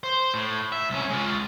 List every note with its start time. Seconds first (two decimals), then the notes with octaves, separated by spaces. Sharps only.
0.03 C5
0.34 A2
0.72 E5
0.90 C2 C#4
1.10 G#3 F4